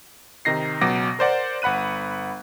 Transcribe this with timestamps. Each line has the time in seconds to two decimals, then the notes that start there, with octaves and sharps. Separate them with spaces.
0.45 C3 D#3 D#4 A#6 C7
0.81 C#2 B2 F#3 D6 A#6
1.19 A#4 C5 D5 F#5
1.62 G1 F#5 B5 F#6 D#7